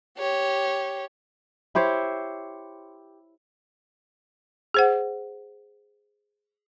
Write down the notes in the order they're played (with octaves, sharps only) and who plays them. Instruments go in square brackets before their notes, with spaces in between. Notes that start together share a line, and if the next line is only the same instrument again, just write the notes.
[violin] G4 C#5
[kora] E4 G4 C5 C#5
[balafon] G#4 C5 F#5